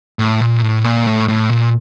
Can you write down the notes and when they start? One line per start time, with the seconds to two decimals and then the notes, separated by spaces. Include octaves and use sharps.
0.19 A2
0.40 A#2
0.62 A2
0.84 A#2
1.06 A2
1.28 A2
1.49 A#2